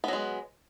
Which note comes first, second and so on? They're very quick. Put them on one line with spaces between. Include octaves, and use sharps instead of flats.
B3 F#3 G#3